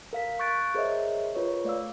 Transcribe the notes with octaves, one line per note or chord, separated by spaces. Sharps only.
A#4 F5 B6
C#6 F#6 G6 A6 D7
G#4 A#4 C5 C#5 D#5 E5
F4 A#4 B4 C#5
A3 D5 F5 E6